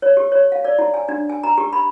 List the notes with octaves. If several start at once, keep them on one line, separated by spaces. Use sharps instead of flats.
C#5
G4
C#5
F5
D5
E4
G#5
D4
G#5
A#5
G4
B5